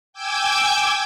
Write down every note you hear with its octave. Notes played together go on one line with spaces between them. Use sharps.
G5 G#5 D6 E6 G6 G#6